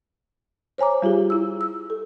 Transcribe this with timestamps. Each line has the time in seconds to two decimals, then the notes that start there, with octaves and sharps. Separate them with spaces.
0.78 C5 C#5 G#5 A#5 D6
1.02 G3 F4 G4 G#4
1.30 E4 E6
1.61 E6
1.90 A4